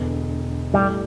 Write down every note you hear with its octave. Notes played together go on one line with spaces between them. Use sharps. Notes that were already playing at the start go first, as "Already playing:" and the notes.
Already playing: E1 E2 D3
A2 G3 A3 G4